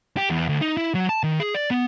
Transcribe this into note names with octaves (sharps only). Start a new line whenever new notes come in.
G4
E2
D2
D#4
E4
F#3
A5
D#3
G#4
D5
B3